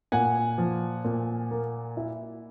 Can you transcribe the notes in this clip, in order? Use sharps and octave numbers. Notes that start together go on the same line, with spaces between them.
A#2 F#5 G#5
F3
A#2
A#3
E4